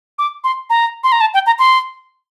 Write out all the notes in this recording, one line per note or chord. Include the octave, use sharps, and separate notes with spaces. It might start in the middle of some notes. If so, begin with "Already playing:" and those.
D6
C6
A#5
C6
A#5
A5
G5
A#5
C6